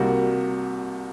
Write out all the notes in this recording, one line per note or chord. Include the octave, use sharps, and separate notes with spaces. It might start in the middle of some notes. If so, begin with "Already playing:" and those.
Already playing: C2 C3 G3 A#3 F#4